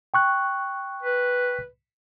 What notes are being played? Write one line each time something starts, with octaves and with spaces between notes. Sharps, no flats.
G5 C#6 F#6
B4